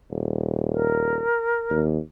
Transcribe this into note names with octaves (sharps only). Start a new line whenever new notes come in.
D#1
A#4
D#2